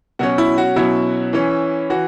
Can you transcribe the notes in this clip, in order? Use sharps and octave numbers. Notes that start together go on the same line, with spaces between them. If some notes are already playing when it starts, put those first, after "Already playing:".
B2 F#3 C#4 F#4
E4
F#4
B2 F#3 C#4 E4
E3 C#4
E3 F#4